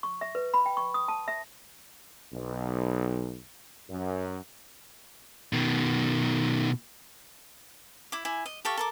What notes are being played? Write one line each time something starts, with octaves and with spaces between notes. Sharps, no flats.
C#6
E5
B4
B5
G5
C#6
D#6
A5
E5
B1
F#2
B2 D#3
E4 D6
E4 G#5
D#5
G4 A4 F5 C#6
A4 A#4 D6